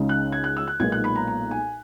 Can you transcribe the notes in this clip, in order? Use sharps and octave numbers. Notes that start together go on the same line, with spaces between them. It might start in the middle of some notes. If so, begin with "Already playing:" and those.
Already playing: C#2 C#3 G#3 D#4
F#6
G#6
F#6
E6
F#6
B1 A#2 G#3 B3 D#4 G#6
F#6
B5
A#5
A#5
G#5